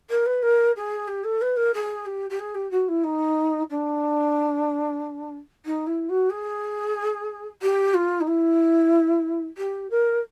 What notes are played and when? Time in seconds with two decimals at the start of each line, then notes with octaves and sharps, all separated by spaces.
0.09 A#4
0.25 B4
0.42 A#4
0.76 G#4
1.07 G4
1.23 A4
1.41 B4
1.56 A#4
1.73 G#4
2.05 G4
2.29 G4
2.39 G#4
2.54 G4
2.71 F#4
2.88 E4
3.03 D#4
3.69 D4
5.65 D#4
5.86 E4
6.09 F#4
6.29 G#4
7.61 G4
7.93 F4
8.20 D#4
8.27 E4
9.57 G4
9.90 A#4